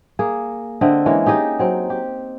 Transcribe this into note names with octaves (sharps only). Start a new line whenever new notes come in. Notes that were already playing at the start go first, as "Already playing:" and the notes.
A#3 G#4
D3 C4 D#5 E5
E3 G#3 A#3 C#4
D#4 G4 G#4 D#5
F#3 C4
G4